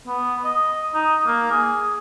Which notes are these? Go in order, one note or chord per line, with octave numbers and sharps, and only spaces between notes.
B3
D#5
D#4
A#3
G#4